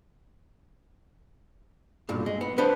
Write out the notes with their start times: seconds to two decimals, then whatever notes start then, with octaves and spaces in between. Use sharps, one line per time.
2.09 B1 G2 A#2
2.26 G#3
2.41 B3
2.58 B3 D4 B4 C5